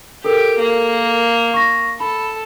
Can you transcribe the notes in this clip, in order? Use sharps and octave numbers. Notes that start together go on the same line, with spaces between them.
G4 A4 A#4
A#3
C#6 A#6
A4 B5